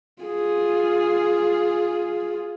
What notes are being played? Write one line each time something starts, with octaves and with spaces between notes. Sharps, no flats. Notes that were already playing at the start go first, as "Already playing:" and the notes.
F4 G#4